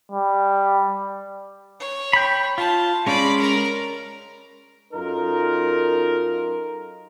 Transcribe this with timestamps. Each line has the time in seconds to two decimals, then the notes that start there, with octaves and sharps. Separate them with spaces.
0.12 G3
1.80 C#5
2.13 G5 B5
2.58 F4 A5
3.06 G#3 C#4 D5 B5
3.40 A#4 A#5
4.93 F#2 D#4 F4 A4 A#4